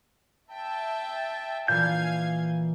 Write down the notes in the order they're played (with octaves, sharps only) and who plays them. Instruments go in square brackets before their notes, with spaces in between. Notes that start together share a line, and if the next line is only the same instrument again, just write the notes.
[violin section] E5 G5 [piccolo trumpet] A5
[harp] A#2 E3 [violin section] F5 G#5 G#6 [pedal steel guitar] G6